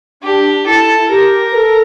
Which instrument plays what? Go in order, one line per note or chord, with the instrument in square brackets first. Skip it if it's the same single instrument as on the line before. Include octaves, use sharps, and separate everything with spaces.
[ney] D4 [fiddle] G4
[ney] E4 [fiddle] A4
[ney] G4 [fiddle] A#4
[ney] B4
A4